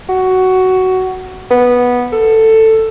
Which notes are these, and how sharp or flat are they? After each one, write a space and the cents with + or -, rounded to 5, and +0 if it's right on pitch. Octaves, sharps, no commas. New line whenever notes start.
F#4 +10
B3 -10
A4 +10